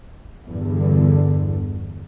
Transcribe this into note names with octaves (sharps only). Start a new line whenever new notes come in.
E2 G2 D3